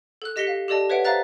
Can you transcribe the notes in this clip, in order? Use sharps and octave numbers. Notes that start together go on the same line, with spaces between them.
A4 F#6
G4 D#5 A#6 B6 C#7 G7
F5
G4 A4 D5 D#5 A5
B4 C#5 E5 F#5 D7
C5 E5 F5 A#5 F#6 A6